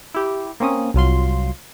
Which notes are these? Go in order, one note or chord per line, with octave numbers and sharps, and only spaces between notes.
E4 G4
A#3 C4 C#4 D#6
C2 F#3 F4 C6